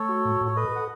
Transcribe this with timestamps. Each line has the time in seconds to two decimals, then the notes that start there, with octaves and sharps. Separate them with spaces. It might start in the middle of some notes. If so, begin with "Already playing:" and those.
Already playing: A3 A4 C#5
0.09 F#4
0.25 A2
0.41 A2 C#5
0.56 A4 B4 D#5
0.72 A4 F#5